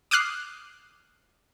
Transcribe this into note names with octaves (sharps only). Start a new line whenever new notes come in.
D6 D#6 F6 F#6 C7